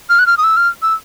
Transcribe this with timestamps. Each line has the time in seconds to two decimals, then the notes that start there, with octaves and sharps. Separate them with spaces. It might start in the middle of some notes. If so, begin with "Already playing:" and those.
0.10 F6
0.19 F#6
0.27 F6
0.37 D#6
0.44 E6
0.57 F6
0.82 E6